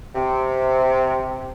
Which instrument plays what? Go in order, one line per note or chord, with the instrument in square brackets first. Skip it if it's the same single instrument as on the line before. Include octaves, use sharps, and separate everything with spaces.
[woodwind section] C3